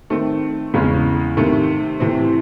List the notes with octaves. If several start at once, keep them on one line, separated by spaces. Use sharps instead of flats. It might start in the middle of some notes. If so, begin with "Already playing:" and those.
D#3 A3 C4
E2 C#3 G#3 C#4
C3 D#3 A3
C3 E3 A3 C4